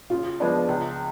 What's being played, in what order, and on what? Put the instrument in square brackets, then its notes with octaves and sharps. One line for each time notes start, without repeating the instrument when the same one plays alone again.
[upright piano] C#3 [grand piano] F4
[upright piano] F3 G#3 B3 D4
C#2